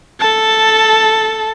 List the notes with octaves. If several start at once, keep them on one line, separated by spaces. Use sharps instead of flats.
A4 A5